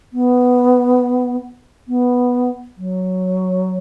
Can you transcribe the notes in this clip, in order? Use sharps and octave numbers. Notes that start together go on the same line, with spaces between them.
B3
B3
F#3